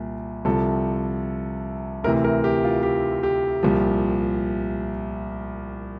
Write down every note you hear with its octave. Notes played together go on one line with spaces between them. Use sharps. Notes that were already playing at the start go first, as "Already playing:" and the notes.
Already playing: C2 A#2
C2 C3 F3 A4
D2 C3 E3 A#4
A#4
G4
F4
G4
G4
C2 A#2 F3